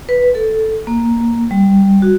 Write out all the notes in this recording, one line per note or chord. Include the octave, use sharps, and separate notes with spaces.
B4
A4
A#3
G3
F#4